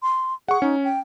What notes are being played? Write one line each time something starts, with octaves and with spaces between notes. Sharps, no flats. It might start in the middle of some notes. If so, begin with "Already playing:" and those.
C6
G#4 F#5 C#6
C#4 D#4
G5